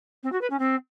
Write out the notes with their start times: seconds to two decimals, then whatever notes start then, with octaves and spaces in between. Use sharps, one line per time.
0.23 C4
0.32 F#4
0.41 B4
0.50 C#4
0.59 C4